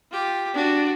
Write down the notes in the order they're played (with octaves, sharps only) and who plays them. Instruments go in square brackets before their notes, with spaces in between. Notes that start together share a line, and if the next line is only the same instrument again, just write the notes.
[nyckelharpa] F4 G4
[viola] D4 [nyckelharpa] F#4